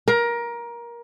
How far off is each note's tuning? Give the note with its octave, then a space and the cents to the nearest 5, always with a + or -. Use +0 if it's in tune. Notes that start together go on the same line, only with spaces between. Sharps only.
A#4 +20